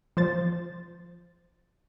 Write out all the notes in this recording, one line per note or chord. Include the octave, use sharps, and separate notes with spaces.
F3 C5 A6